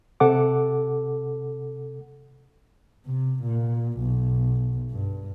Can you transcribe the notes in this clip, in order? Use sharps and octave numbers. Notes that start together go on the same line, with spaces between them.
C3 A4 F#5 D6
C3
A#2
B1
G2